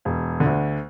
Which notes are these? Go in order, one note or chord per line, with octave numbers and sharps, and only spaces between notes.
E1
D3
D2